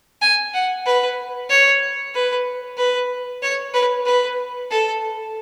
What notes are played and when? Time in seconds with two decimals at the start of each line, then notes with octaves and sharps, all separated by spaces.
0.21 G#5
0.54 F#5
0.86 B4
1.50 C#5
2.14 B4
2.77 B4
3.42 C#5
3.74 B4
4.05 B4
4.70 A4